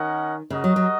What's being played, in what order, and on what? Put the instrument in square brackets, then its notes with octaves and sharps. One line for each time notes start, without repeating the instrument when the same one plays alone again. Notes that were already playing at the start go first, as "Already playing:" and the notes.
Already playing: [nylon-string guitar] D#3 [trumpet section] C#4 A#4 D#5 F#5
[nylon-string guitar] C#3 [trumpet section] F#4 A#4 D#5 F#5
[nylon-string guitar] F#3
F#3